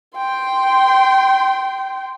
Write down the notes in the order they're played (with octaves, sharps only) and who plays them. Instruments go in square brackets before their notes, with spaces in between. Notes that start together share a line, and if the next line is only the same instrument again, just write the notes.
[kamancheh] G5 C6